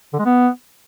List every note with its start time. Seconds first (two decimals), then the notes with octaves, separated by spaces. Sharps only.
0.13 D3
0.19 G#3
0.25 B3